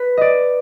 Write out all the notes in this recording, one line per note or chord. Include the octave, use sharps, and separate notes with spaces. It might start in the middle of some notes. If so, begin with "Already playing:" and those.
Already playing: B4
D5 D#5